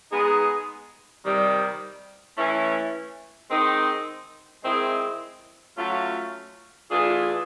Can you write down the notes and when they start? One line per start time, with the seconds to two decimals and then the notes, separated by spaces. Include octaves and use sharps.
0.12 G#3 B3 D#4 G#4
1.24 C3 D#3 G3
2.38 E3 A3 C#4 E4
3.51 D#3 G#3 C4 D#4
4.64 D#3 G#3 C4 E4 G#4
5.77 F#3 A3 C#4 F4
6.90 E3 A3 D4 F4 G#4